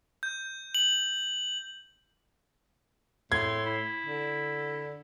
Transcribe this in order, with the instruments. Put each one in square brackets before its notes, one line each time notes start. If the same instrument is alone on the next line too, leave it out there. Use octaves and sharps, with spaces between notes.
[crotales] G6
F#7
[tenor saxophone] A2 [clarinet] C6 [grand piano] G#6
[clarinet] E4
[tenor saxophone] D3